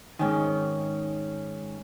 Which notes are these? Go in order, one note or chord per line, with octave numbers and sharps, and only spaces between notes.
G#2 D#3 C#4 G5 G#5